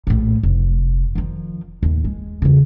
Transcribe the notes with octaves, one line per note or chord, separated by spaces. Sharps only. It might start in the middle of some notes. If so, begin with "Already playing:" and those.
A#1 A2
F1
D#3 F3
D#2 A2
G#3
E2 C#3